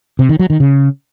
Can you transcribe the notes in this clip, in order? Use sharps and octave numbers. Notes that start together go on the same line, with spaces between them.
C3
D#3
F#3
D#3
C#3